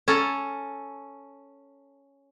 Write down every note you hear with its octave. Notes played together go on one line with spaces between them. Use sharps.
C#4 A4 A#5